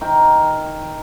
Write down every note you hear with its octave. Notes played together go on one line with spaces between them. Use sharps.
D#3 A#4 G5